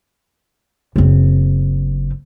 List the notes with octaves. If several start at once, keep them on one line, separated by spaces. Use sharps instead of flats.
F#1 C4